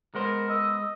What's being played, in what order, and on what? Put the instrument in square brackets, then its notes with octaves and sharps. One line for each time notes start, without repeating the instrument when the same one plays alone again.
[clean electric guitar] G#3 B3 C5 [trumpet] A#4
[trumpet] D#5 [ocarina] E6